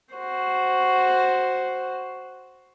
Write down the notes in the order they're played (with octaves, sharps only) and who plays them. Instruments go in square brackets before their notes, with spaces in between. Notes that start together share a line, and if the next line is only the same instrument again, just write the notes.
[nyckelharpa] F#4 C5